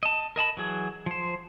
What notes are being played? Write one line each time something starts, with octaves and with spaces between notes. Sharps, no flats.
D#5 A5
A#4 D#5 A5 B5
E3 F#3 G#4
F3 C5